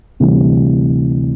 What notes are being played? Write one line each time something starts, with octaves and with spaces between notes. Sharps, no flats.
D2 C3 E3 G3